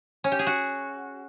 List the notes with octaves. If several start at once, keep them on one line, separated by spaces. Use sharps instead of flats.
C#4
G4
G#4
F#4